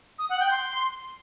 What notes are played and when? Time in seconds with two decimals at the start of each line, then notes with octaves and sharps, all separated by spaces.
0.19 D#6
0.29 F#5
0.40 G5
0.51 C6